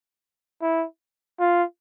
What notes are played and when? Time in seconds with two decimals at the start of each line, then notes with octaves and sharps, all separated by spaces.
0.62 E4
1.39 F4